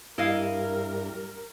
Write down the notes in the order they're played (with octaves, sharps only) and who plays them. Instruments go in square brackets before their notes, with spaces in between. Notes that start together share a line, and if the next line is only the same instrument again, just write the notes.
[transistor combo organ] G2 [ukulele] E4 D#5 F5 [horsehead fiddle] A#4